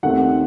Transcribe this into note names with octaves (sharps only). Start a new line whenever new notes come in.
D#2 D#3 A3 C4 F#5